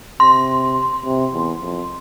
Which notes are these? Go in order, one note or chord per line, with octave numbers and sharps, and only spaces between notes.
C3 C6
C3
E2
F2